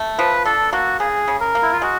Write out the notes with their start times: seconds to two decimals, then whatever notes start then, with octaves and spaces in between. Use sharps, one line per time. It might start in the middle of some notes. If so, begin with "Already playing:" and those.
Already playing: A3
0.18 F3 B4
0.45 D4 A4
0.73 A#3 F#4
1.00 C#3 G#4
1.28 C#3
1.41 A#4
1.55 A#3
1.62 E4
1.73 F4
1.82 G#3 F#4